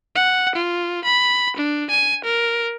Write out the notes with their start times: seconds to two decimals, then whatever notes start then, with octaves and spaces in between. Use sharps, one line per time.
0.16 F#5
0.56 F4
1.05 B5
1.57 D4
1.90 G#5
2.25 A#4